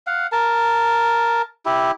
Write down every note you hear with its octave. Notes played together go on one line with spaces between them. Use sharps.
F5 F#5
A#4 A5
E4 G4